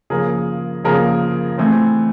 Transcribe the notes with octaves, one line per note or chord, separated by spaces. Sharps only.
C#3 F3 A#3 G#4 A#4
C#3 F3 A#3 G#4 A#4
E3 A3 C4